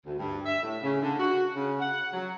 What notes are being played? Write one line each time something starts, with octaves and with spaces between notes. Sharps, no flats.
D2
G2
E5
A2
C#3
D3
F#4
C#3
F#5
F#3